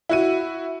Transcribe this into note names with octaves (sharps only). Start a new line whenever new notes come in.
E4 F#4 D#7